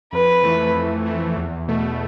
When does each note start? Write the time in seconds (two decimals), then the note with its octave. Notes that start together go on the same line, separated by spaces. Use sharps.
0.13 F2 B4
0.43 E3 A3
0.75 F2
1.06 E3 A3
1.37 E2
1.68 B2 A3